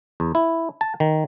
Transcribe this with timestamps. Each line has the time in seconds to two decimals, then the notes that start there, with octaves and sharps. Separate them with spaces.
0.20 E2
0.35 E4
0.81 A5
1.00 D#3